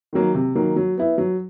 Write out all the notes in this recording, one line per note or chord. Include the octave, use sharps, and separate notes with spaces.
D#3 F#3 A#3
C3
D#3 F#3 A#3
F#3
B3 E4
F#3